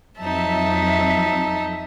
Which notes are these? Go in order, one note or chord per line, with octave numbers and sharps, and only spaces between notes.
F2 F#3 D#4 E5 A5